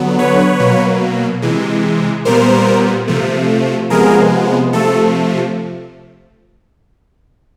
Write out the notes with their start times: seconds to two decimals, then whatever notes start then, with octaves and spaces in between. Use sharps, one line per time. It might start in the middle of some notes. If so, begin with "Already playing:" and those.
Already playing: D3 F#3 B3
0.19 B4 C#5
0.60 B2 F#3 A#3
1.42 C3 E3 G#3
2.25 A#2 G3 B3 A#4 C5
3.08 C3 F3 A3
3.90 C3 F3 G#3 B3 G#4 A#4
4.73 C3 F3 A3 A4